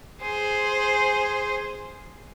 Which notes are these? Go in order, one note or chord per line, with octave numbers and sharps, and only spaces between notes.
G#4 C5